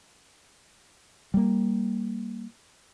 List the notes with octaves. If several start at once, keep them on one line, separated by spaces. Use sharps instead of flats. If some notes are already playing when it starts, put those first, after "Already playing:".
G3 A#3